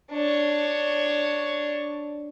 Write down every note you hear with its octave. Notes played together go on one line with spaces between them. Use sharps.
D4 C#5